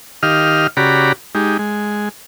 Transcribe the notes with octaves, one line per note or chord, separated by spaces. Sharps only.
D#3 G4 D#5 F5 F6
C#3 F#4 G4 D5 A#5 B5
G#3 D#4 G4
G#3